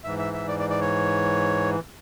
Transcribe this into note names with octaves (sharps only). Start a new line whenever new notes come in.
G#2 E3 E5
E5
E5
D5
D5
D5
C#5